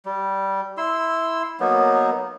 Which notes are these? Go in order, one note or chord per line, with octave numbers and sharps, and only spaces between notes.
G3
E4 C6 E6
F#3 A#3 B3 D#4